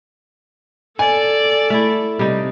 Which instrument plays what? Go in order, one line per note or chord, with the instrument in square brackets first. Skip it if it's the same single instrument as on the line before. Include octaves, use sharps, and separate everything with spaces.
[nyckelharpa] A4 [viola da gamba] D5 [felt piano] G#5
[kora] A3 E4
[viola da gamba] C3 [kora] G3 D#4